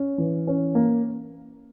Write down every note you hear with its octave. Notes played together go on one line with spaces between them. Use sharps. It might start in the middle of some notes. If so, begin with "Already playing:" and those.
Already playing: C#4
E3
C#4
A#3